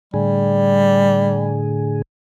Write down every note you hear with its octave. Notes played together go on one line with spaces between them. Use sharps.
A2 D3 G3 G#4